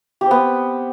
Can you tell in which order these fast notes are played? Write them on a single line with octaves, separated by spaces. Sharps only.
G4 C4 B3